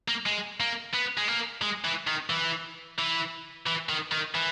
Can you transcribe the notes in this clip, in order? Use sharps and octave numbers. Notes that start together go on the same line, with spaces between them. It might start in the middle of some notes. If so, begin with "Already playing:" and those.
A#3
G#3
A#3
B3
G#3
A#3
G#3
E3
D#3
E3
E3
E3
D#3
D#3
E3